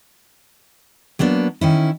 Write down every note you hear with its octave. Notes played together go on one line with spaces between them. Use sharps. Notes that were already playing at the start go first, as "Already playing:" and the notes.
F#3 A#3 B3 D4
D#3 C#4 E4